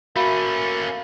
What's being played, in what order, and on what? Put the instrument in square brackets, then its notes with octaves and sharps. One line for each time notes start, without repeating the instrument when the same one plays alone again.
[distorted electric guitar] A3 C#4 [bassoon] A#3 [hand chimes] F#4 E5 [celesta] B5